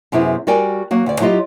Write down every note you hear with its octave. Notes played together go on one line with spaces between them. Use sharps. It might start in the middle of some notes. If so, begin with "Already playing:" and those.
F#2 C3 B3 E4 G#4
G3 F#4 A#4 D5 G5 G#5
F#3 A#3 F#4
D2 D5
F#3 E4 F4 G4 D#5